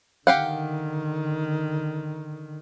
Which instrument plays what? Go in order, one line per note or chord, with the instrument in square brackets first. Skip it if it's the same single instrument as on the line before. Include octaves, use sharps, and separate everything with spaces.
[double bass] D3 D#3 [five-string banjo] G4 F5 F#5